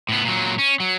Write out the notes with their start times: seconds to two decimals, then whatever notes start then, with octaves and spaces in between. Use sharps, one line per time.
0.09 A2 B3
0.25 A#2 F#3
0.58 C#4
0.80 F#3